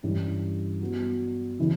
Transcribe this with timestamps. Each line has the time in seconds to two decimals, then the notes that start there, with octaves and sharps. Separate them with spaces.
0.03 G2 E3 G3 C#4 G4
0.81 F#3 B3 F#4
1.59 C#3 E3